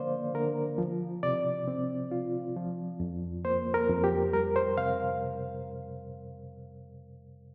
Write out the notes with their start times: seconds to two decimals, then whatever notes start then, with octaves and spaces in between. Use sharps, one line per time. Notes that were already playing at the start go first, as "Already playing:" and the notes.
Already playing: D3 F3 A#3 C5 D5 F5
0.34 D3 A#4
0.78 F3
1.23 C3 D5
1.68 C4
2.11 F4
2.56 F3
3.00 F2
3.45 A#3 C5
3.74 A#4
3.89 F2
4.04 G4
4.33 G3 A#4
4.56 C5
4.78 C3 F5